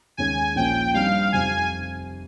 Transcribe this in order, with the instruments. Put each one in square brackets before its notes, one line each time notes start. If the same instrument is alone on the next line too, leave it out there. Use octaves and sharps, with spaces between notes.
[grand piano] D#2 D#3 G#3 C#4 [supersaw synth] G#5
[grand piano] A#1 A#2 F3 A#3 C#4 [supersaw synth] G5
[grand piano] G2 G3 C4 D#4 [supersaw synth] F5
[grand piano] F1 F2 C3 [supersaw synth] G#5